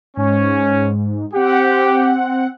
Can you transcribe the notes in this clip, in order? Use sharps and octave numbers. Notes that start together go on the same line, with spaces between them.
G#2 C#4
C4 G4 F#5